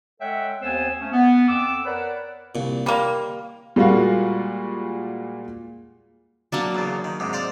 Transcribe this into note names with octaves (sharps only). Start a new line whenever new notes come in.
G#3 A4 C#5 E5 F#5 G5
D#2 B3 C4 C5 G#5 E6
A3 C#4
B3
F2 B3 D6 E6
A#4 B4 C#5 D5 F#5 B5
C2 A#2
G3 A#3 C6
A#2 G3 G#3 A#3 F4 F#4
F#3 A#3 D4 D5
E2 C#3
D#3
G#2 C3
C5 D5 F5